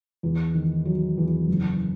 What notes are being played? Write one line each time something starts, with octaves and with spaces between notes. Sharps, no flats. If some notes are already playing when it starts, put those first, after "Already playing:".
E2
D#3
F#3
E2
F#1